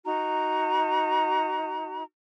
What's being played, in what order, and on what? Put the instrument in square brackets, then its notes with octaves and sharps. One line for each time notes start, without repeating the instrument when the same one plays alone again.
[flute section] D#4 F#4 A#5